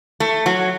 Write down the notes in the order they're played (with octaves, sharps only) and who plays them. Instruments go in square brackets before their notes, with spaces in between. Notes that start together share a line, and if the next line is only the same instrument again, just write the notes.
[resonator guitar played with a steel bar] A3
F#3